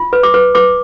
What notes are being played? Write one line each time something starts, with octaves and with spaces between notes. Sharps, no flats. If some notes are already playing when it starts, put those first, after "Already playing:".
Already playing: F4
B4
D6
B4
B4 D6